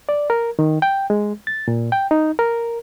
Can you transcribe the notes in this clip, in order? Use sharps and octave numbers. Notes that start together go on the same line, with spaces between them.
D5
A#4
D#3
G5
G#3
A6
A#2
G5
D#4
A#4